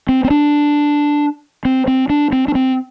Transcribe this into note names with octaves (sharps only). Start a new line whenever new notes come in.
C4
C4
D4
C4
C4
D4
C4
D4
C4